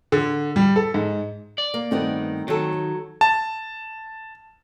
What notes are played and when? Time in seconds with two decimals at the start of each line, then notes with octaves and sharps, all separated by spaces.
0.12 D3
0.56 G3
0.76 A4
0.94 G#2
1.58 D5
1.74 A#3
1.91 G2 D#3 A3 B3 C4 D#4
2.48 D#3 F#3 A4
3.21 A5